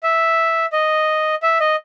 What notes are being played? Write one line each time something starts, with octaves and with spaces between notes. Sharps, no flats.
E5
D#5
E5
D#5